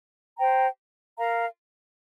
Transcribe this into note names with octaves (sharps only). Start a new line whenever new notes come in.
C5 G5 A#5
A#4 F5 A#5